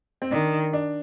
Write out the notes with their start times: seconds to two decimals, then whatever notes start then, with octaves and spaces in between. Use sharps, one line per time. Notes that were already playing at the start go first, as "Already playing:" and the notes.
0.22 C4
0.31 D#3 D4
0.73 D4